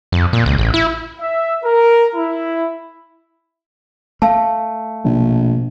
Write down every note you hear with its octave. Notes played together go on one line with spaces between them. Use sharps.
F2
A#2
C#2
A1
E4
E5
A#4
E4
A3 F5 A5
A#1 B2